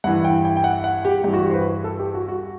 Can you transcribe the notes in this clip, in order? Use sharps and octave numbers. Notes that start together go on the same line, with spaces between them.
G2 E3 F#5
G5
G5
G5
F#5
F#5
G4
G2 E3 G4
F#4
G4
C5
B4
A4
G4
F#4
F#4